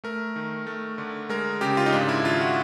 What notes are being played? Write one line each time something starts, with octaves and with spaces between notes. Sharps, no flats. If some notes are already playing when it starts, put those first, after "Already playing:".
A3 A#4
D#3
A3
D3
G#3 A#4
C#3 G4
F4
D#4
G#2 D4
E4
D#3 F4
F#4